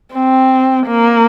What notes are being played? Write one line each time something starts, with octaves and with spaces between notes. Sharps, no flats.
C4
A#3